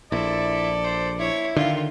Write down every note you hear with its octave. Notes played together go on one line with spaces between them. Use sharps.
A#1 E4 A4 D5
C5
E4 C#5
D3 D#3 F4